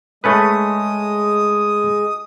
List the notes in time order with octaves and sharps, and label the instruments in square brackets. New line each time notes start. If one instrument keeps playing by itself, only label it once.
[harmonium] G#3 [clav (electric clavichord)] A3 C#4 B4 [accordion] D#6